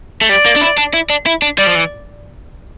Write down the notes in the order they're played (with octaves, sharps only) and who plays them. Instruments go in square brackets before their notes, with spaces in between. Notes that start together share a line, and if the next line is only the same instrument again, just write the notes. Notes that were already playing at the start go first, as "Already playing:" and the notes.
[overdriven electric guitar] A3
[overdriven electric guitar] G3 [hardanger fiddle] D5
[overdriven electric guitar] A#3
D4
E4
D4
E4
D4
E4
D4
[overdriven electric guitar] G3 [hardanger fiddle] D5
[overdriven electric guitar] F3
E3